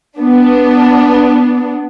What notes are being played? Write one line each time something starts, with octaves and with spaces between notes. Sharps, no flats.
B3 D4